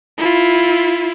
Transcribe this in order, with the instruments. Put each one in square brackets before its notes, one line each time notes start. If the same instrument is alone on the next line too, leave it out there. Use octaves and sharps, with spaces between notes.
[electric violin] E4 F4